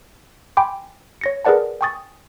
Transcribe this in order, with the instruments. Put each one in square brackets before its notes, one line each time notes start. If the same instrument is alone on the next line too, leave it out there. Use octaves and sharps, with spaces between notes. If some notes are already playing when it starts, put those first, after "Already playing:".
[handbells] G5 G#5 B5 C6 D6
C#5 A#6 C#7
G#4 A#4 B4 D5 F#5 A5
G5 G#5 C#6 D#6 A6